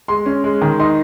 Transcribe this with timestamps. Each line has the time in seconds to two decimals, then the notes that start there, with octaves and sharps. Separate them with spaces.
0.08 G#3 C6
0.26 C#4
0.44 G#3
0.62 D#3
0.80 D#4 C6